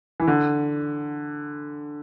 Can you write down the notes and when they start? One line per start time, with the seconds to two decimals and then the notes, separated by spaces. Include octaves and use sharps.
0.20 E3
0.27 D3